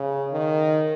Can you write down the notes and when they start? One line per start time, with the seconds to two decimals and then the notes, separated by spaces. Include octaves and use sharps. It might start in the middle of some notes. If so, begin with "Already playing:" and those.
Already playing: C#3
0.32 D#3